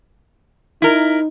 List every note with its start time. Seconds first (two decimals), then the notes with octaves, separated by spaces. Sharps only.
0.82 D#4 E4 A#4